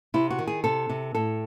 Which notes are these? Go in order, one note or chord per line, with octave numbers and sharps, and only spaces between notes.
C3 E4
F#4
D#3
G#4
C3 A4
C3
A2 A4